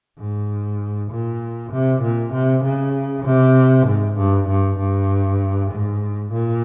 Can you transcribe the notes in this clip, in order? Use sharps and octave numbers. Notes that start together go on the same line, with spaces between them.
G#2
A#2
C3
A#2
C3
C#3
C3
G#2
G2
G2
G2
G#2
A#2